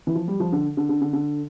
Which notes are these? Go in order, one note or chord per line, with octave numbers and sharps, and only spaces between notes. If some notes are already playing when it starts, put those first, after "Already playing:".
E3
F3
G3
F3
D3
D3
D3
D3
D3